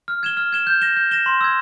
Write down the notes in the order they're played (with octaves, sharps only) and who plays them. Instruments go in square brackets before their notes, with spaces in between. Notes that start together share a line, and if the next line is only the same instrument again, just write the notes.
[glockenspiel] F6
G#6 E7 G7
F6
G#6 E7 G7
G6
A#6 E7 G7
G6
A#6 E7 G7
C6
E6 G#6